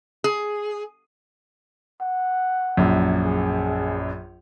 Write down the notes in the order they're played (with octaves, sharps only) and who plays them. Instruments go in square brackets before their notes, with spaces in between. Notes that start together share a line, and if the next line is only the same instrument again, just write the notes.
[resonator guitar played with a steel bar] G#4
[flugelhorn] F#5
[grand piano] A#1 F#2
[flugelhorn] G#4